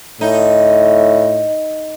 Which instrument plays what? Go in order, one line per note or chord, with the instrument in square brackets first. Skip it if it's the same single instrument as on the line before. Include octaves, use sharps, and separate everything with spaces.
[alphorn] A2 [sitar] D#4